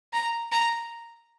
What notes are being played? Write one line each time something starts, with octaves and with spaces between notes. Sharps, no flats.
A#5
A#5